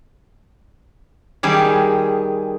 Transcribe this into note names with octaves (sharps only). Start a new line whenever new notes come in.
D#3 G3 G#4